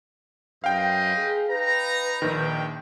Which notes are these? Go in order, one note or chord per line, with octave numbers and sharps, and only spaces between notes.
F#2 B4 C5 D#5 F5 G5
G#4
D#4 B4 A#5
A#1 D#3 G5